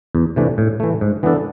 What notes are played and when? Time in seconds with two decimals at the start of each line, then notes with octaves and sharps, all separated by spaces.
0.15 E2
0.36 C3 E3 A3 D4
0.58 A2
0.80 E3 A3
1.01 G#2
1.23 E3 B3 D4 A4